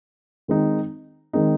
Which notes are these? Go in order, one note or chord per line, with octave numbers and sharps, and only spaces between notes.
D#3 G#3 C4 D#4
D#3 G#3 C4 D#4